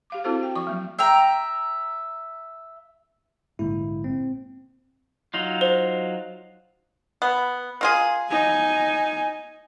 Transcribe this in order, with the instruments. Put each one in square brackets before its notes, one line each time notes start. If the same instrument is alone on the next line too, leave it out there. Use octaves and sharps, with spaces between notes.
[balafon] G4 F5 D6
C4 E4 F#4 A4 C5
G5
F3 C#6
F#3 A#3
[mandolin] E5 G5 A#5
[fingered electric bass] A#1 G#2 [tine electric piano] D3 A#3 E4
[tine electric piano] C4
[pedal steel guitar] F#3 D#4 F4
[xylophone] C5
[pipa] B3
A#3 F4 G#4
[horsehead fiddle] D#4 G#5